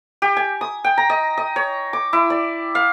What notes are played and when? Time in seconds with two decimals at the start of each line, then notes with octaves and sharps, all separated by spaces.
0.22 G4
0.37 G#5
0.61 D#6
0.84 G5
0.98 A#5
1.10 D#5
1.38 D#5
1.56 C#5
1.93 D6
2.13 E4
2.30 D5
2.75 F5